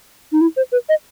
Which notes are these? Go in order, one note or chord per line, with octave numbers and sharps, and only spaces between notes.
D#4
E4
C5
B4
D#5